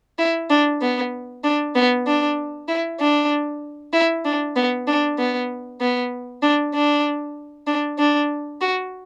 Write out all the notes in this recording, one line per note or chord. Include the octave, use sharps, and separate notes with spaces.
E4
D4
B3
D4
B3
D4
E4
D4
E4
D4
B3
D4
B3
B3
D4
D4
D4
D4
F#4